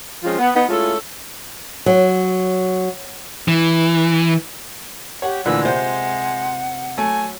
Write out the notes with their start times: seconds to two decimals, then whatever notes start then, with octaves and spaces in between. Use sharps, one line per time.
0.24 F3 G#3 C4 C#4 F4
0.39 B3
0.54 B3 D#4
0.69 G#3 A3 C#4 E4 F4 A4
1.86 F#3
3.48 E3
5.22 G4 C#5 F#5
5.46 D2 A#2 D3 E3 G#3 B4 E6
5.65 C3 C5 F#5
6.98 F#3 A3 G#5